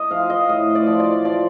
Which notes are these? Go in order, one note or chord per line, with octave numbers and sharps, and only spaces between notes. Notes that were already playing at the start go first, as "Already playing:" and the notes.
Already playing: D#5
F3 F5
D#5
A2 D#5
D5
F3
D5
F3 D5